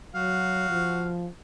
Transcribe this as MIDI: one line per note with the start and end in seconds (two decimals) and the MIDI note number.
0.15 0.69 54
0.15 1.15 66
0.15 1.15 77
0.70 1.26 53